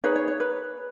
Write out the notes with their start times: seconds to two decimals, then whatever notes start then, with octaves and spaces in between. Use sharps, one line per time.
0.04 D#4 G#4 B4 C#5
0.16 C#5
0.28 C#5
0.40 B4